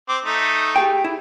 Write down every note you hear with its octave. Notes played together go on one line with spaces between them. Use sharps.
C4 D6
A3 D#4
G4 G#4 G5
E4